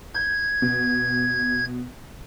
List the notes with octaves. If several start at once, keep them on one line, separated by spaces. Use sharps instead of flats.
G6 G#6
B2